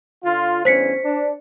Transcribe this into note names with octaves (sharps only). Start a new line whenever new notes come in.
D3 F4
E2 G2 C#4 C5 B6 C#7
D4